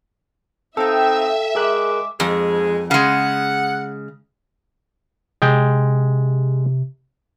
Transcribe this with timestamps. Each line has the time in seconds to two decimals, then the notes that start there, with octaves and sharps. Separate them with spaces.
0.77 C4 D#4 A4 E5 F5 G5
1.55 G#3 G#4 A#4 D6 F#6
2.20 F2 G#2 G#3 G#4
2.91 C#3 G#3 F#5
5.42 C3 G#3 G5